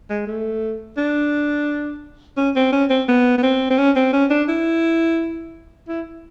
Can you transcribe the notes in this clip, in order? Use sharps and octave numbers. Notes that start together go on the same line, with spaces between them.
G#3
A3
D4
C#4
C4
C#4
C4
B3
B3
C4
C4
C#4
C4
C#4
D4
E4
E4